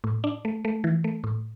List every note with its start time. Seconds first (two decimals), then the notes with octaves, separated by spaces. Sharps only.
0.04 A2
0.24 D4
0.45 A3
0.65 A3
0.84 E3
1.04 A3
1.24 A2